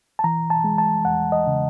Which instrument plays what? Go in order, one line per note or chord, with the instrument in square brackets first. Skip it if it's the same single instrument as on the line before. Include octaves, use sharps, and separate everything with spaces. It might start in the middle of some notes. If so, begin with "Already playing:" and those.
[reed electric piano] A5
E3 A#5
A5
G#3
A5
E2 F#5
D#5
C#3